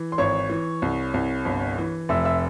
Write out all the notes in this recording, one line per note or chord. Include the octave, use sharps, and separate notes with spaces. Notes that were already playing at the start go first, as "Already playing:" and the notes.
Already playing: E3
C6
G#1 C#5 C#6
E3
C2
C2
G1
E3
F1 E5 E6
E5 E6